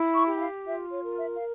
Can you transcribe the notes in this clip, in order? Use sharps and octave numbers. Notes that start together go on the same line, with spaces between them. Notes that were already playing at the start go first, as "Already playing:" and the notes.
Already playing: E4
C#6
G4
G5
F5
F4 E5
C#5
A#4
E5
F5